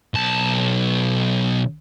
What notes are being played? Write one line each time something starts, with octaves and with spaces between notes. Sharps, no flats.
B1 A5